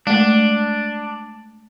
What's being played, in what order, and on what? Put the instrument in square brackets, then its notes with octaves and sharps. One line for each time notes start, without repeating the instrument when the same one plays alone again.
[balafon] G#3 A3 [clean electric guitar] D4